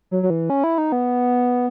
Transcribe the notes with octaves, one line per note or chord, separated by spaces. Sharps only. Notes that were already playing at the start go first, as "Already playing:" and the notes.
F#3
F#3
E3
C#4
E4
D#4
B3